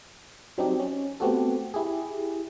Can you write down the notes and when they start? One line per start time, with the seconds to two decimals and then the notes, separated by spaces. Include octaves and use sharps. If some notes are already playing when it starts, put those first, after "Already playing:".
0.58 F#3 C4 D4 D#4 G4
0.80 C#4
1.20 A3 B3 C4 F#4 G4 A4
1.74 E4 G4 G#4